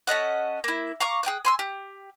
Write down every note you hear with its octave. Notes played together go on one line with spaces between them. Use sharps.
C#4 A4 D#5 F#5
A#3 E4
F5 A#5 C#6 D6
G#4 G5 D#6 F#6
G#5 C6 E6
G4